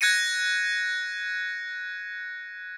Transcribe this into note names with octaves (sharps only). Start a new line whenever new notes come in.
F#6 G#6 A#6 C#7 D#7